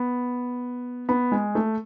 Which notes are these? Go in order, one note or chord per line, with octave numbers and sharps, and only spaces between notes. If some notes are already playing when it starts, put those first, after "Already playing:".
Already playing: B3
B3
G#3
A3